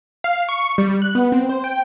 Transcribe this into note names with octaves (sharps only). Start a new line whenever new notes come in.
F5
C#6
G3
F#6
B3
C4
C5
G5